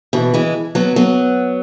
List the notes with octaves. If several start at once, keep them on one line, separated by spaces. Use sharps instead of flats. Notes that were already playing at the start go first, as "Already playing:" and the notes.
B2 E3
E3 G#3
F#3 B3
F#3 B3